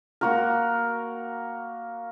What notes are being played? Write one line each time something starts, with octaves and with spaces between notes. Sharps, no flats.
A#3 F#4 A#4